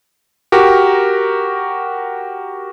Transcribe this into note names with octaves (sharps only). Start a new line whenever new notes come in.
F#4 G4 A#4